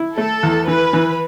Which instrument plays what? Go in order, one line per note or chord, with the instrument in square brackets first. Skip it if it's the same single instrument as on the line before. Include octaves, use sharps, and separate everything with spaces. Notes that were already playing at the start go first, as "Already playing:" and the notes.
Already playing: [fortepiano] E4
[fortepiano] A3 [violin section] A4
[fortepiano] E2
[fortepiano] E3 [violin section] B4
[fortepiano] E3